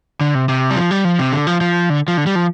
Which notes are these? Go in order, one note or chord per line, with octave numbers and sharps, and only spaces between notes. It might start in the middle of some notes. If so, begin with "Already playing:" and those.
D3
C3
C3
G3
F3
G3
F3
C3
D3
F3
F3
D3
F3
D3
G3
F3